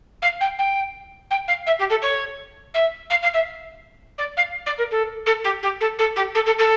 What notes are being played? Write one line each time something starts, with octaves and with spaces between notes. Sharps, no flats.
F5
G5
G5
G5
F5
E5
G4
A4
C#5
E5
F5
F5
E5
D5
F5
D5
A#4
A4
A4
G4
G4
A4
A4
G4
A4
A4
A4